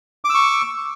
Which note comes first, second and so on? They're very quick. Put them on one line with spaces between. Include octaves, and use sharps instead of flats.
D6 E6 C#6